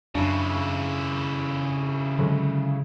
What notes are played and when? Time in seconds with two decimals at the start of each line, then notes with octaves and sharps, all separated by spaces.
0.15 F#2 C#3 D4 E4
2.19 D3 F#3 G#3